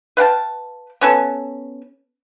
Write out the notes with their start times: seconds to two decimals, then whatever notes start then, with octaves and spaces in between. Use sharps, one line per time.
0.17 B4 F5 G5 A5
1.01 B3 C#4 A4